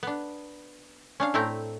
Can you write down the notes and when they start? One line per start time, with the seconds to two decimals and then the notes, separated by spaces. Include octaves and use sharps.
0.03 B3 D4
1.20 C#4 D4 F5
1.34 A2 A3 C4 E4 G5 A#5